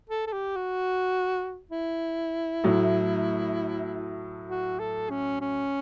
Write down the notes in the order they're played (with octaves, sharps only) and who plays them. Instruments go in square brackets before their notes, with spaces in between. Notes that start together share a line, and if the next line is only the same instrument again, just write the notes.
[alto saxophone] A4
A4
G4
F#4
E4
[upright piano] A2 F#3 A3
[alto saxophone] F#4
A4
C#4
C#4